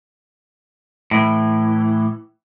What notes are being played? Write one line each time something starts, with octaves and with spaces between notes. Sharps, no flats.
A2 E3